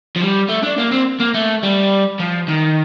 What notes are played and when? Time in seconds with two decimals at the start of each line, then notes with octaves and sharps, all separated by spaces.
0.16 F3
0.21 G3
0.49 A3
0.63 D4
0.78 A#3
0.91 C4
1.20 A#3
1.34 A3
1.63 G3
2.20 F3
2.48 D#3